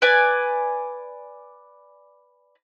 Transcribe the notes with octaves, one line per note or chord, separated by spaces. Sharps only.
B4 D5 G#5